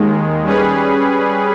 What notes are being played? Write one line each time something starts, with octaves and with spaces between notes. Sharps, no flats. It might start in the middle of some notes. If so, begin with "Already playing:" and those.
Already playing: D#2 D#3 G#3
G3 C#4 G#4 B4